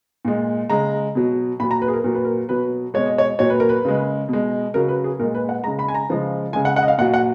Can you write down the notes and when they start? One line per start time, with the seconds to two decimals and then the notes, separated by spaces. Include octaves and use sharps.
0.25 A#2 G#3
0.70 C#3 G#3 A#5
1.15 B2 F#3
1.60 A#2 B5
1.63 F#3
1.71 A#5
1.82 B4
1.88 G#4
1.93 A#4
2.04 A#2 F#3 A#4
2.15 B4
2.25 A#4
2.49 B2 F#3 B4
2.94 B2 G#3 C#5
3.06 D#5
3.18 C#5
3.39 A#2 F#3 C#5
3.50 B4
3.60 A#4
3.69 B4
3.85 C#3 G#3
4.29 B2 G#3
4.74 C#3 F#3 A#4
4.88 B4
5.04 G#4
5.19 A#2 A#4
5.23 G#3
5.35 B4
5.49 F#5
5.64 C#3 G#3 A#5
5.79 B5
5.88 G#5
5.94 A#5
6.09 C#3 F3 G#3
6.53 G#3 G#5
6.56 C#3
6.65 F#5
6.76 F#5
6.82 D#5
6.88 F5
6.98 A#2 F#5
7.01 F#3
7.14 F#5